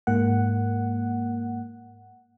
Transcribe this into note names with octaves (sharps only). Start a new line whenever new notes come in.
G#2 A#3 F#5